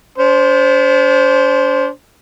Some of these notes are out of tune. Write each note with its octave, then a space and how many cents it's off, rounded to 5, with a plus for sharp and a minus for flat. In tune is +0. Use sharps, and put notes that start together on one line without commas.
D4 -45 C5 +0